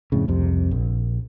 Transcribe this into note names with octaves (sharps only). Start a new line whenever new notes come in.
F2 A2 C#3
C2 F2 C3
A#1